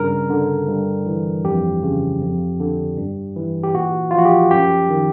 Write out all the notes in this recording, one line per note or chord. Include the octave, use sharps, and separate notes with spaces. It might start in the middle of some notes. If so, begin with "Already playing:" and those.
Already playing: G2 C#3 A#4
D3
G2
E3
F2 G4
C#3
F2
D3
G2
E3
G4
A#2 F#4
F3 F4
F#4
G4
F#2 G4
D#3